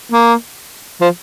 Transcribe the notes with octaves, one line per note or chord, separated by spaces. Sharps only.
A#3
F3